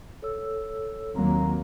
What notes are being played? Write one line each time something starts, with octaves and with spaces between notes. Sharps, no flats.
A4 C#5 E6
D#2 F#3 A#3 C4 A#5